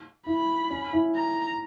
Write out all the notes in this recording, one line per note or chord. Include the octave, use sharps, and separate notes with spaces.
E4 B5
C#4
E4
A#5